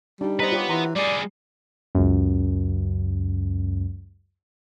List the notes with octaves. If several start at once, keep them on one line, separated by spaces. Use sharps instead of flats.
G3 D4 D#4
B4 C5 D#5 F#5 A#5
F4 G4 C#5
E3 A#5 C6
G3 G#4 D5
C#2 F#2